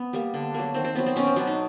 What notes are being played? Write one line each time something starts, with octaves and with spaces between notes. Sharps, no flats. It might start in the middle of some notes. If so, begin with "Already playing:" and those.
Already playing: B3
G3 A#3
D3
F#3 A#3
D#3 C4
C4
F#3 B3 C4
C4
B2 C#4
C4
F#3 B3 D4
D#4